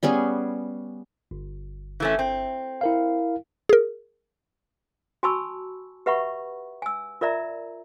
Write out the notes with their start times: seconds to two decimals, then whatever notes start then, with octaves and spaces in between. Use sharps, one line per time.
0.03 G3 B3 C#4 G#4
1.31 G1
2.00 E3 A3 C#4
2.19 C4
2.81 E4 A#4 F5
3.69 G#4 A#4
5.23 F#4 G#5 A5 B5 C#6 E6
6.06 G4 B4 E5 F#5 B5 C#6
6.82 G#5 E6
7.21 F4 A#4 D5 E5 A#5